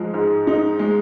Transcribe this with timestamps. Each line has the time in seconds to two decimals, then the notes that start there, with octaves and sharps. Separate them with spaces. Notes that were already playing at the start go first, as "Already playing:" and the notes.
Already playing: G#2 F3 G#3
0.14 G#2
0.47 D#4
0.79 G#3